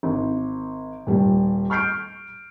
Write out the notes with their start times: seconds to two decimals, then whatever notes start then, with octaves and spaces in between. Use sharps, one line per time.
0.03 G#1
1.07 D#1 G3
1.70 C#6 F6 G6 C7 D7